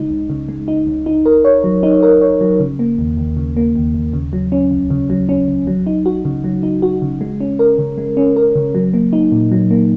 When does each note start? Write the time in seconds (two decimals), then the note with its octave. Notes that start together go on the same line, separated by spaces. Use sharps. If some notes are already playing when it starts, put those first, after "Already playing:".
Already playing: C#3 G#3 D#4
0.10 C#2
0.30 C#3
0.49 G#3
0.68 D#4
0.87 C#2
1.06 D#4
1.26 A#4
1.45 C#5
1.64 F#3
1.83 D#4
2.02 A#4
2.21 C#5
2.41 F#3
2.60 C#3
2.79 A#3
2.98 D#2
3.17 D#2
3.37 C#3
3.57 A#3
3.75 D#2
3.94 D#2
4.13 C#3
4.33 F#3
4.52 C#4
4.71 C#2
4.90 C#3
5.10 F#3
5.29 C#4
5.48 C#2
5.67 F#3
5.87 D#4
6.06 F#4
6.25 C#3
6.44 F#3
6.63 D#4
6.82 F#4
7.02 C#3
7.21 G#3
7.41 C#4
7.59 A#4
7.78 C#3
7.98 G#3
8.17 C#4
8.36 A#4
8.55 C#3
8.75 F#3
8.94 A#3
9.13 D#4
9.32 A#2
9.52 F#3
9.71 A#3